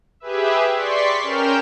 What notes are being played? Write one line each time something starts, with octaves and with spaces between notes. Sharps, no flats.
G4 G#4 B4 E5
D5 C6 C#6 B6
C#4 A#4 G5 F6 G6 E7